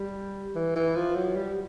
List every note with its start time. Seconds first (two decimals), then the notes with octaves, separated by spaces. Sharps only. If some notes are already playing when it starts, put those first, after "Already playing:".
Already playing: G3
0.55 E3
0.76 E3
0.96 F3
1.16 F#3
1.36 G3